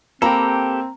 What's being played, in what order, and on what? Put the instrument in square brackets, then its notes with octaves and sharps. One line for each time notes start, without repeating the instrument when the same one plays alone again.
[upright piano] A#3 [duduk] C4 [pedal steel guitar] G4 A4 [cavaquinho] A#5 B5